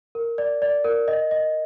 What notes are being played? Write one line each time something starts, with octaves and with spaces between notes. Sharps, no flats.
A#4
D5
D5
A#4
D#5
D#5